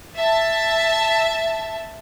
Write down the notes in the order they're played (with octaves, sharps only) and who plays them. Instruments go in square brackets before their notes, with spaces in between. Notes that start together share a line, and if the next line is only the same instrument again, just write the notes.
[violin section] E5 A5